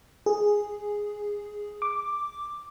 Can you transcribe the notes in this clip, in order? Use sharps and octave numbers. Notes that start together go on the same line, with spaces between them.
G#4
D6